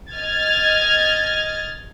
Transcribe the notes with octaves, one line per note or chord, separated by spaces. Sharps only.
D#5 F6 G#6 A6